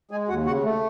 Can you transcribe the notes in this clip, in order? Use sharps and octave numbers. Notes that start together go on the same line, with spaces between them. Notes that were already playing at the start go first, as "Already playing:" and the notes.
G#3 G#4 G#5
D#2 F#4 F#5
C#3 F#4 F#5
A3